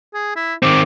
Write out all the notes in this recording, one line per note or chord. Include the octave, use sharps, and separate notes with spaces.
G#4
E4
D#3 C4 D6